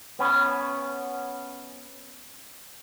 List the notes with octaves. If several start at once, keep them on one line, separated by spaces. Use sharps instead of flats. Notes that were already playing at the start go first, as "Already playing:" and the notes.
B3 C#4